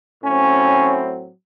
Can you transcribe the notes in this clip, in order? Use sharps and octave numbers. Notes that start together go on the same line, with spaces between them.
A2 F#3 C4 C#4